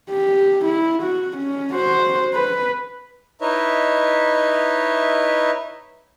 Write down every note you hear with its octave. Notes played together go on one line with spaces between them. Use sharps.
G4
E4
F#4
C#4
F#4 C5
B4
D#4 E4 B4 C#5 D#5 E5